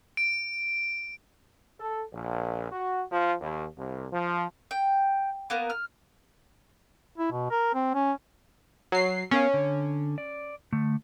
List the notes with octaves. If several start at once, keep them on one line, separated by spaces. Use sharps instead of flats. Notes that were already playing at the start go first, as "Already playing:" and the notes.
D7
A4
A#1
F#4
F3
D#2
C2
F3
G5
A#3 B3 A#4
F6
E4
B2
A#4
C4
C#4
F#3 C7
B3 C#4 A#4 F5
D3
D5
D3 A3